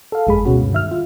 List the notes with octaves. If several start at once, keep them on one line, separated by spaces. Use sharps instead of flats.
A4 F5
G1 F2 G#3 G#4 B5
D2 B2 B3 C#4 F#4
G2
D#3 E5 F6
F4